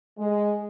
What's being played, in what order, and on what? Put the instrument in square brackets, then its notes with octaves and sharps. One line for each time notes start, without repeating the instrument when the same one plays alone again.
[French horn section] G#3